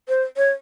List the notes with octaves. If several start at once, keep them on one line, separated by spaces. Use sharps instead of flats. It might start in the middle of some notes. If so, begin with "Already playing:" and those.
C5
C#5